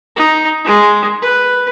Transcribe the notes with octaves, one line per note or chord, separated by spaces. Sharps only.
D#4
G#3
B4